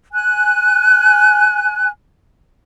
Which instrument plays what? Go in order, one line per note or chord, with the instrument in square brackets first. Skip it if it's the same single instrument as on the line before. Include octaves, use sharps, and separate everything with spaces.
[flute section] G#5 F#6